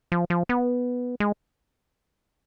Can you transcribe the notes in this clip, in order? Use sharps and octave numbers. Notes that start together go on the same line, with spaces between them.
F3
F3
B3
G#3